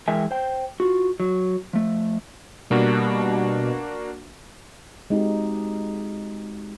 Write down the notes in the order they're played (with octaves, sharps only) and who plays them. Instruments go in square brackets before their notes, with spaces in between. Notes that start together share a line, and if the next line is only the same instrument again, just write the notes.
[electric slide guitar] E3 G#3 A#4 E5 G5 G#5
C5 G5
F4 F#4
F#3
F3 A3
[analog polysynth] B2 [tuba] G3 [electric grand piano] A#3 D4 F#4
[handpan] G#3 C4 D#4 F#4 G4